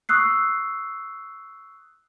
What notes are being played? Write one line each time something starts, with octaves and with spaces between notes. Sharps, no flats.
C#6 D#6 E6 F#6 C7